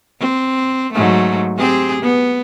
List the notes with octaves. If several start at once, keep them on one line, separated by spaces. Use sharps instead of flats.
C4
G#2 F#3 A3
C4 G4 G#4
B3